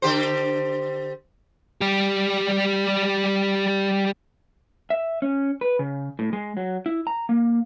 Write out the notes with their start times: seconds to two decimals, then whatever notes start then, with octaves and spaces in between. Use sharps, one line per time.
0.02 D3 G4 C5
1.81 G3 G4
4.90 E5
5.22 C#4
5.61 B4
5.79 C#3
6.19 A2
6.33 G#3
6.57 F#3
6.86 E4
7.07 A#5
7.29 A#3